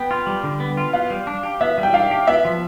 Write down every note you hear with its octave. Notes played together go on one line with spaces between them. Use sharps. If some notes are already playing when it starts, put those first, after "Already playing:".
Already playing: B3 G5
F4
G3
D3
B3
F4
B3 F5
G3
D4
G4
B3 E5
G3
G5
D4 F5
G4
B3 E5
F3